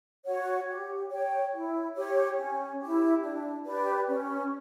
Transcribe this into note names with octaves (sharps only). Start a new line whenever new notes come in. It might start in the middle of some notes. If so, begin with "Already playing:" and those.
F#4 C#5 F#5
G4
C#5 G5
E4
G4 C#5
C#4
E4 G4
D4
G4 B4 D5
C#4